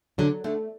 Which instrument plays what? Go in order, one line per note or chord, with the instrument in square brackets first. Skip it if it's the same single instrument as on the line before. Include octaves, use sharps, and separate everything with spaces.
[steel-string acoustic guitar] D3 [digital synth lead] F#3
[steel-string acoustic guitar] D3 [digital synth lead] A3